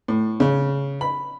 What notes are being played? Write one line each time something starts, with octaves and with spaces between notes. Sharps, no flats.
A2
C#3
B5